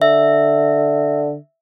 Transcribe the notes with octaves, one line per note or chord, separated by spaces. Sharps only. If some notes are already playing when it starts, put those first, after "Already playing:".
D3 E5